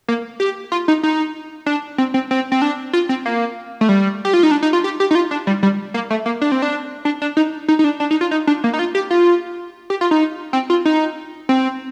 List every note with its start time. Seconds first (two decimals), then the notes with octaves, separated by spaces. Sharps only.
0.08 A#3
0.40 G4
0.72 F4
0.88 D#4
1.03 D#4
1.66 D4
1.98 C4
2.14 C4
2.31 C4
2.52 C4
2.62 D4
2.93 F4
3.09 C4
3.26 A#3
3.81 A3
3.89 G3
4.25 G4
4.34 F4
4.43 D#4
4.51 D4
4.63 D#4
4.73 F4
4.84 G4
5.00 G4
5.11 D#4
5.15 F4
5.31 D4
5.47 G3
5.63 G3
5.94 A#3
6.10 A3
6.26 A#3
6.42 D4
6.52 C4
6.62 D4
7.05 D4
7.22 D4
7.37 D#4
7.68 D#4
7.79 D#4
7.84 D4
8.00 D4
8.11 D#4
8.21 F4
8.31 D#4
8.47 D4
8.64 A#3
8.73 D#4
8.79 F4
8.95 G4
9.11 F4
9.90 G4
10.01 F4
10.11 D#4
10.53 C4
10.70 F4
10.85 D#4
11.49 C4